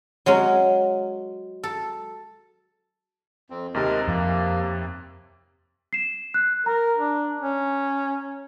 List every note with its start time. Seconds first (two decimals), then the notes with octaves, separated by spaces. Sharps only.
0.26 F#3 G#3 C#4
1.64 A4
3.50 F2 C4
3.74 D#2 C3 G#3 A#4
4.07 F2 A#3
5.93 C7 E7
6.34 F#6
6.66 A#4 A#5
6.97 D4
7.41 C#4